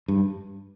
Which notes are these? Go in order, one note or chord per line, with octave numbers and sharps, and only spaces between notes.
G2